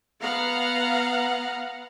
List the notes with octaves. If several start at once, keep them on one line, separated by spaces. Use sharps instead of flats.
B3 F5 F#5 A#5